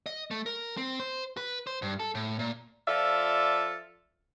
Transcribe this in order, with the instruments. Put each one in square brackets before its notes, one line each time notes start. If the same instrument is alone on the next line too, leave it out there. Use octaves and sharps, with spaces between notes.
[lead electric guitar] D#5
A3
A#4
C4
C5
B4
C5
G2
A4
A2
A#2
[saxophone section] F3 F4 A4 D5 E5